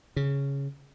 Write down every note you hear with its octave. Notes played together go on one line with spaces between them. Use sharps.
C#3